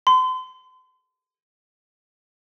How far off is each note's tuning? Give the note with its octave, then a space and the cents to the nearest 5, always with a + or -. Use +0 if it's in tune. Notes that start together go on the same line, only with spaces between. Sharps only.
C6 -40